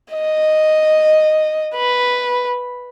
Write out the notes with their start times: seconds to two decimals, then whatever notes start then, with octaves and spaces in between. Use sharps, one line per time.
0.14 D#5
1.76 B4